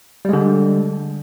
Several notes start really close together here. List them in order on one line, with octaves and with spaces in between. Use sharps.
G3 G#3 D3